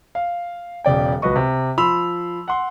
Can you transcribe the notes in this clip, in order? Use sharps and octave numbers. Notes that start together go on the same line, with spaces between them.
F5
E1 C#3 D5 G5
C#2 F#4 B4 D#5 C#6
C3
F3 B5 C6 E6 F7
F#5 C6